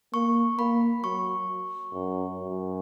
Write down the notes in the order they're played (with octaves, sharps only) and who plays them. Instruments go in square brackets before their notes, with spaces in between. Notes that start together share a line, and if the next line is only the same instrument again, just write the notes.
[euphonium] A#3 [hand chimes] C#6
[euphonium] A#3 [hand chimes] B5
[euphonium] F#3 [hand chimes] C#6
[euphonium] F#2
F#2